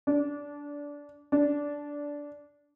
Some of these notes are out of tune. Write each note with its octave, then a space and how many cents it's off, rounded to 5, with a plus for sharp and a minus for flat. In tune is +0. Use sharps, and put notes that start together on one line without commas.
D4 -20
D4 -15